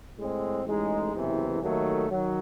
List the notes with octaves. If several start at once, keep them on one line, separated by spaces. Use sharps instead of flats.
A2 G#3 C4
A1 A2 G#3 D#4
F#1 E2 C3 E3
D#2 D#3 F#3 A3
D#3 F#3